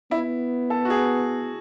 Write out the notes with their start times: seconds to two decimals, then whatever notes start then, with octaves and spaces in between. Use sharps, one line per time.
0.11 B3 E4
0.70 A4
0.85 F#4
0.90 G#4